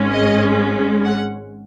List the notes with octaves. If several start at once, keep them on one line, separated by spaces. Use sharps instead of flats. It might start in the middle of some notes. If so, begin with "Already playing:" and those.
Already playing: G#1 G#2 G#3 C#4
D#5
F#5